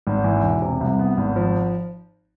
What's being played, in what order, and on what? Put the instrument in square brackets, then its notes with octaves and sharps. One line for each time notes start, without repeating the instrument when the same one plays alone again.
[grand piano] G#1
E3
E1
C3
C2
B3
G#1
F3